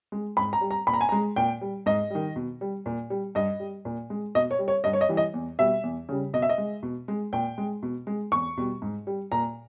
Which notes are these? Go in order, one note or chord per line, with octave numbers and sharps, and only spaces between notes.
G#3
G#2 B5
A#5
G3
A#5
A#2 B5
A#5
G#5
G#3 A#5
A#2 G5
G3
G#2 D#5
D#3 G3
B2
G3
A#2
G3
G2 D#5
G3
A#2
G#3
B2 D#5
C#5
G3
C#5
G2 D#5
C#5
D#5
E3 G3
D#5
E2
B2 G3 E5
E2
C#3 G3
B2 D#5
E5
D#5
G#3
B2
G#3
A#2 G5
G#3
B2
G#3
E2 C#6
B2 G3
G#2
G3
A#2 A#5